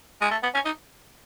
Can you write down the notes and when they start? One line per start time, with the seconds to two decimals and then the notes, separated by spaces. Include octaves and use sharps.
0.21 G#3
0.31 A3
0.43 B3
0.54 C#4
0.65 D#4